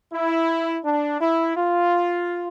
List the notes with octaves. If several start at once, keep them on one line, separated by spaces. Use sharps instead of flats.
E4
D4
E4
F4